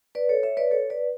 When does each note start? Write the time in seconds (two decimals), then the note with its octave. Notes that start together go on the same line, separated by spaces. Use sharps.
0.15 B4 D5
0.29 A4 C#5
0.43 C#5 E5
0.57 B4 D5
0.71 A4 C#5
0.90 B4 D5